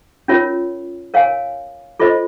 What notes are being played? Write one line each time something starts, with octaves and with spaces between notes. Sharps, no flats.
C#4 F4 A#4 C#5
A#4 C#5 F5 G#5
F4 A4 C5 D#5